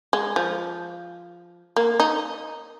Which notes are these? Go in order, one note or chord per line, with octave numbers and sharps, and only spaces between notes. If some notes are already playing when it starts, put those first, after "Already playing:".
G#3
F3
A#3
D#4